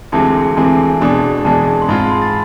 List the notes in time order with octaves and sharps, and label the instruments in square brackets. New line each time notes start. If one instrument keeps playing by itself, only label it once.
[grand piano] D2 C3 E3 G#3 C4 [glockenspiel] A5
[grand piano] D2 C3 E3 G#3 C4 [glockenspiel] G#5
[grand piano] E1 E2 B2 G#3 D4
[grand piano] E1 E2 B2 G#3 D4 [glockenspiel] A5
[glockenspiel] C6
[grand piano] G#2 G#3 C4 F4 [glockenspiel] B5
[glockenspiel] C6
B5
A6